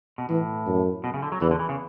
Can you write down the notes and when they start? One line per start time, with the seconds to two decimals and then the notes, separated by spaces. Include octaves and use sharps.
0.18 B2
0.29 A2 E3
0.67 F#2
1.04 B2
1.14 C#3
1.22 D3
1.32 F#3
1.41 E2 E3
1.51 D3
1.59 E3
1.69 C#3